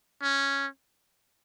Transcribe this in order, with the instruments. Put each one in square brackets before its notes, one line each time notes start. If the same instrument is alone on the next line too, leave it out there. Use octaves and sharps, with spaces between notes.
[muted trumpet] C#4